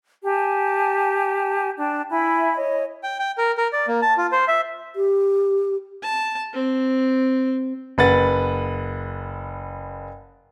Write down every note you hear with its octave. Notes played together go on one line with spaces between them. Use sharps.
G4 G#5 A5
D4 G5 A5
E4 E5 G#5 B5
C#5 D#5
G5
G5
A#4
A#4
D5
A#3
A5
F4
C5
E5
G4
A5
C4
F#1 B4 F#5 A6